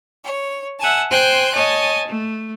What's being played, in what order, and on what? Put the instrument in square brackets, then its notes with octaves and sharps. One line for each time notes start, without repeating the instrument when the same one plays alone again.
[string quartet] C#5
E5 F#5 G#5 A5
C5 G5 G#5 C6 F#6 G6
C#5 D#5 G#5 A5
A3